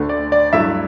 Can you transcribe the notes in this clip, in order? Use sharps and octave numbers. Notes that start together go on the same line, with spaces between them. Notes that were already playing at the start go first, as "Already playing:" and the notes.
Already playing: D2 D3 A3
D5
D5
G2 F#3 A3 E4 E5